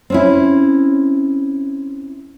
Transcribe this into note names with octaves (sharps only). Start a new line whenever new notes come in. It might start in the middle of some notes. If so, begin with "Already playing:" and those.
C4 C#4 E4